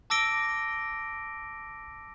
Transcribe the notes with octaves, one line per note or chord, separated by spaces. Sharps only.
A5 D6 E6 A#6 D7 G7